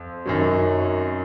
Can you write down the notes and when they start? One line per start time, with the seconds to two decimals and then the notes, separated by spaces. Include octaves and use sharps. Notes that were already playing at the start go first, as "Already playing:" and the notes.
Already playing: F2
0.26 F#2 D#3 F#3